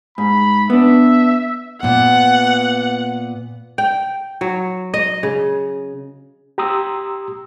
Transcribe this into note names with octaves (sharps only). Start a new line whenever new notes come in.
G#2 B5
B3 D4 E5
A#2 B3 F#5
G5
F#3
D#5
C#3
G4 A#5 C6 D#6 E6